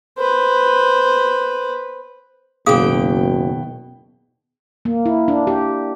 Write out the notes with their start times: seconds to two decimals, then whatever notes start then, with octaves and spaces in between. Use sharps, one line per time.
0.18 B4 C5
2.66 F#1 D#2 B2 G#4 F5 G5 D#6
4.85 A#3
5.06 E4
5.28 D4
5.47 G4